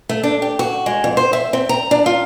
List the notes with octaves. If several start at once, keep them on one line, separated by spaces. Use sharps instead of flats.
A3
D4
G4
F#4
G#3
F2
C5
E5
C4
A#5
D4
F4